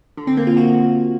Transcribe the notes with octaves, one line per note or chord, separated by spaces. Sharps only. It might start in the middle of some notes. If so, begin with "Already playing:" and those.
D3
C4
A#3
F4
F#4